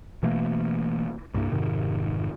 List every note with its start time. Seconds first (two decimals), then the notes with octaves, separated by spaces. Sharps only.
0.23 B2 E3 A3 A#3
1.34 C2 G2 A#3
1.52 F1 G#2 C3 D#3